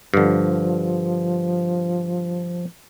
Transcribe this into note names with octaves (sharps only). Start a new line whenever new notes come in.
G2 D3 F3